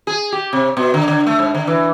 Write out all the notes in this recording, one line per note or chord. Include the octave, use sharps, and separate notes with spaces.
G#4
G4
C3
B2
D3
D3
A3
G#2
D3
E3